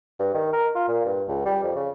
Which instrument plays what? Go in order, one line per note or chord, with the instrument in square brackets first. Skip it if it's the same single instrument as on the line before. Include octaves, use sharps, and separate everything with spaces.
[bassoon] G2
D#3
A#4
F4
A#2
G2
C#2
G3
F2
C#3